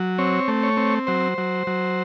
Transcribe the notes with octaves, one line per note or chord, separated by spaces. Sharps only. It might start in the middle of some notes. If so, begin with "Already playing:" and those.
Already playing: F#3
C4 C#5
A3
C#5
C4
F#3 C5
F#3
F#3